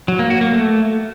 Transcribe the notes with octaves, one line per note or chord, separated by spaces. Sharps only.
F#3
A#3
F#4
A#3
A3